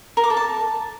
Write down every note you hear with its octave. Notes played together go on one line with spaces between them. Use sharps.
A#4
D6
A4
A5